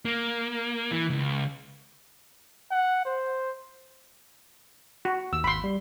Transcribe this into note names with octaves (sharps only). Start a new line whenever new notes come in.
A#3
E3
C#2
F#5
C5
F#4
D#2 E6
G#1 B5 C6
G3